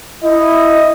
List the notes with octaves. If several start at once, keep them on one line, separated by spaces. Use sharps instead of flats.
E4 D#5